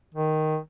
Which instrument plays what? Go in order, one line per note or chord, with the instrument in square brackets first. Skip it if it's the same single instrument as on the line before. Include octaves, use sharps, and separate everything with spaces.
[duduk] D#3